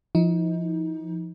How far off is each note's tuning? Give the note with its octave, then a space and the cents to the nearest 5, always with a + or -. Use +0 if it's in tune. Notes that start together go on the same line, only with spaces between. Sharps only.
F3 -20 D#4 +30